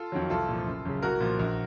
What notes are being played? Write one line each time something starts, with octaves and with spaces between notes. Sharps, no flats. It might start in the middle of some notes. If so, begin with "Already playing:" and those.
Already playing: F4 A4
F2 D#3 F#3
C2 F4 A4
A#2
F3
F#1
F#2 C#3
C2 F#4 A#4
A#2 F3
A#1